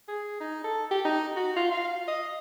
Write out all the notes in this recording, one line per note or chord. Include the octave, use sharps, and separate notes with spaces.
G#4
D#4
A4
G4
D#4
F#4
F4
F5
D#5